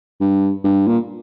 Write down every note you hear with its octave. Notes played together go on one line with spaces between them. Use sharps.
G2
G2
A#2